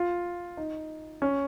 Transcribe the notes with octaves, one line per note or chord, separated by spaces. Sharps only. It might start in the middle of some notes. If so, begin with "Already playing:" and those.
Already playing: F4
D#4
C#4